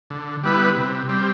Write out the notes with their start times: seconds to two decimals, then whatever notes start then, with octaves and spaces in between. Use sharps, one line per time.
0.10 D3
0.44 G3 B3 E4 B4
0.76 C3
1.09 G3 C4